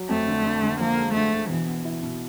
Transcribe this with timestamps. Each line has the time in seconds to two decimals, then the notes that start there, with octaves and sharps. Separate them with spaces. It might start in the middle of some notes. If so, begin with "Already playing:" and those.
Already playing: F#3
0.09 F2 A3
0.27 D3
0.44 D3
0.62 D3
0.80 F3 A#3
0.97 G#3
1.15 D3 A3
1.32 D3
1.49 B2 E3
1.67 B3
1.85 E4
2.03 B2